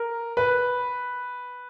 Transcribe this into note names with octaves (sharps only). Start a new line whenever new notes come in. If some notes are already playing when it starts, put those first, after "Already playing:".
Already playing: A#4
B4